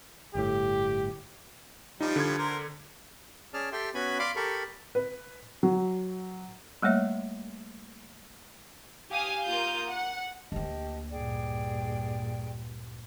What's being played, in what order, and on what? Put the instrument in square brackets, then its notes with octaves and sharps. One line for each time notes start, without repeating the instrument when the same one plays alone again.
[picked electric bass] G1 A2 [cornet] G4
[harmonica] F3 G3 [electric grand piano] D#4
[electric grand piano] D3 G#6
[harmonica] A#4 C5
[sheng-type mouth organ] C#4 G#4 D5 A5 F6
G4 A4 E5 G5 C6
B3 C#4 F#4 G#5 B5
D5 F5 B5 C6 D6
G4 A4 A#4 B5 C#6
[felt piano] B4
F#3
[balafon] G3 A3 A#3 C#5 E5
[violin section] G4 F5 G#5 D#6
A#3 F4 F5 D#6 G6
F#5
[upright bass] D2 A#3 [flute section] G4 D#5 A5
[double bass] G2 A#2 [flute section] G#4 D5 G5